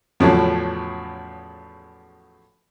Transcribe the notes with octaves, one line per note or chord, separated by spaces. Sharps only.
E2 A2 C#3 F3 F#3